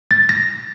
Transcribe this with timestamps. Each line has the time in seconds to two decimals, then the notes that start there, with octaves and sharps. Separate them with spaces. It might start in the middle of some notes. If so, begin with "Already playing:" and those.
0.11 A6
0.29 A#6